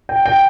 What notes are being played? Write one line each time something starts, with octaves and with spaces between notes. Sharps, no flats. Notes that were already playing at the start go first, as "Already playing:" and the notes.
G5
G5